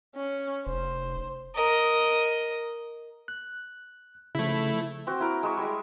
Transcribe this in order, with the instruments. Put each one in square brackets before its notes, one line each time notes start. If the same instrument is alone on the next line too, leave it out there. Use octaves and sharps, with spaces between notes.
[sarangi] C#4
[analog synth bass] F1 [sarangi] C5
[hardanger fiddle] A#4 D#5
[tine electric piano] F#6
[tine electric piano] C#3 F3 [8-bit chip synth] A3 E4
[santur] C4 F#4
E4 A#4
G#3 E5 C#6
G3 G#3